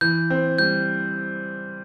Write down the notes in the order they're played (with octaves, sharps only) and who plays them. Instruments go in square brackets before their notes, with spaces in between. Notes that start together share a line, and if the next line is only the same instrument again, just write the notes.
[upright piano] E3 [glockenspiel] G6
[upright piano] C4
[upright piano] G3 [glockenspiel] G6